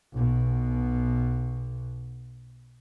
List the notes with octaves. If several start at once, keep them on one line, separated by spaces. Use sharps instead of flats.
B1 B2